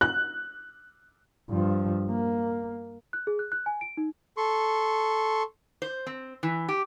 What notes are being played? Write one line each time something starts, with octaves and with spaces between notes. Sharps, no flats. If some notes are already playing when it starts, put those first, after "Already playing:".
F#6
G2 F3
A#3
F#6
G#4
F#6
F#6
G#5
D7
D#4
A4 C6 C#6
C5
C4
E3
G4